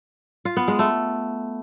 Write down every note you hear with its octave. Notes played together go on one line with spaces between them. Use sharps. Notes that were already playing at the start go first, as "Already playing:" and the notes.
F4
B3
G#3
A3